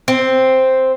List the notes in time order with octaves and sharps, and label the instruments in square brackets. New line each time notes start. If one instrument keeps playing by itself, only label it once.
[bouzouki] C4